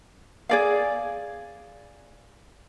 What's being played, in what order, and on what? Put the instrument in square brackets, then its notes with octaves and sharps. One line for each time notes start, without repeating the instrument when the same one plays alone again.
[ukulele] G#4 D5 F5